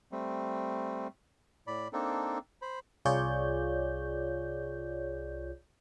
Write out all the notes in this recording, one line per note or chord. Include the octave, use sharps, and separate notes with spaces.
G3 A3 C4
A2 D5 B5
A#3 C4 D4 D#4 A4
C5 B5
C2 F4 G#4 C#5 D5 G6